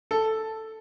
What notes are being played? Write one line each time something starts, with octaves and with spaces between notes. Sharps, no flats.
A4